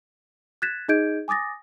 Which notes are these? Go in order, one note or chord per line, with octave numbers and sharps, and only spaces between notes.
F#6 G#6 A6 B6 E7
D#4 G#4 D#5 G6 G#6 D7
G#5 D6 D#6 A6 A#6